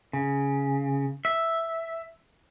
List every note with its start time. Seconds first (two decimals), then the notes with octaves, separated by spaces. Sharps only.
0.13 C#3
1.25 E5